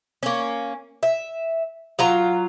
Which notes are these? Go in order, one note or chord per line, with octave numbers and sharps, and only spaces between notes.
A#3 C#4
E5
F#3 F4 A#5